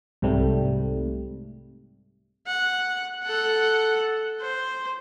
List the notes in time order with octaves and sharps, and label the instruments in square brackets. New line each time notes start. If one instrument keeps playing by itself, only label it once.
[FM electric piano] C2 G#2 C3 G3 A3
[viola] F#5
A4 F#5
C5